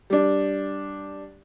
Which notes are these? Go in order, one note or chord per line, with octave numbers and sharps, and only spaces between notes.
G3 D4